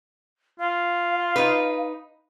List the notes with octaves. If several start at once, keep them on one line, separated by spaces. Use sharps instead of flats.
F4 F5
D#4 B4